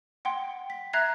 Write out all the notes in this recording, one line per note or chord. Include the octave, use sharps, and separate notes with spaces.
F#5 G5 C6
B6
E5 A#5 F#6 G#6 A#6 C7